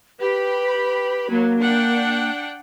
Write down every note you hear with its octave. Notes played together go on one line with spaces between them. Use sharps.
G4 B4 B5
F#3 A#3
D4 F#5 G5